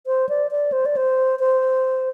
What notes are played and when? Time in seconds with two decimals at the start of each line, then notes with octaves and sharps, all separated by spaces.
0.07 C5
0.29 D5
0.51 D5
0.72 C5
0.86 D5
0.97 C5
1.39 C5